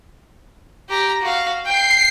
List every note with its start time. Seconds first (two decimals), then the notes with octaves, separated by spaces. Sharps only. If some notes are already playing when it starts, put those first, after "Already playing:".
0.89 G4 A#5
1.22 F#4 F5
1.66 G5 C7